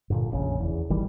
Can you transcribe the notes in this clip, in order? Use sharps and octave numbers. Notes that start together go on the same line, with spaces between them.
G2 A#2 D3
F1 A#1 A#2 C#3
E2
G#1 D#3 E3 G3